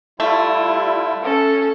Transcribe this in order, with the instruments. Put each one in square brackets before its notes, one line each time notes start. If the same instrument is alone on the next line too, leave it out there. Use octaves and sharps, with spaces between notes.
[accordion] G3 E4 F4 [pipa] A3
[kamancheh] C#4 A4